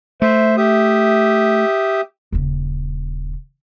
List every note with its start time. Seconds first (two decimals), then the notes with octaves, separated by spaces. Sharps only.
0.22 A3 C5 E5
0.57 G4 E5 D#6
2.32 D#1 C#3